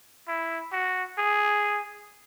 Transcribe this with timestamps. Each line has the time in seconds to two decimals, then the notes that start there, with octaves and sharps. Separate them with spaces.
0.28 E4
0.72 F#4
1.18 G#4